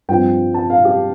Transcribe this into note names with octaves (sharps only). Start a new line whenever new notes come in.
G2 F3 C4 G5
A5
F5
G4